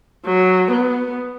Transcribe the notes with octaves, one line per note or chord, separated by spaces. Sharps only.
F#3
B3